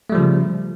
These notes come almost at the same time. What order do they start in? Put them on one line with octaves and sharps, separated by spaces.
A3 G3 F3 C#3